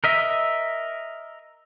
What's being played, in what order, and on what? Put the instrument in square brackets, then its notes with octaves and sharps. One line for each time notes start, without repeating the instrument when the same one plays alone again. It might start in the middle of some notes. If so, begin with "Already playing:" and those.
[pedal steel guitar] A#4 D#5 E5